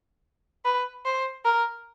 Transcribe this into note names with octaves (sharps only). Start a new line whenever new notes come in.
B4
C5
A#4